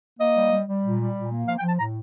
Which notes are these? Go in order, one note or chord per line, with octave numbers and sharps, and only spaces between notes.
A#3 D#5
G3
G3
G3
A#2
G3
A#2
A#3
F3 F5
G5
F3
A5
A2 A#5